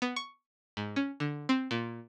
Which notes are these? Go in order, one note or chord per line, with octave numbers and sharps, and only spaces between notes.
B3
C#6
G#2
C#4
D3
C4
A#2